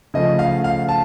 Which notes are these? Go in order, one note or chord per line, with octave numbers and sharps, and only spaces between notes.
C#3 F3 A3 D#5
F5
F5
A5